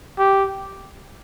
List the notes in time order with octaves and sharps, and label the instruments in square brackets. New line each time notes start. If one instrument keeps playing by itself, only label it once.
[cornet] G4